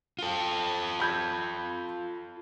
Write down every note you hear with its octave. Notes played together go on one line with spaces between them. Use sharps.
F4 A4
B5 G6 G#6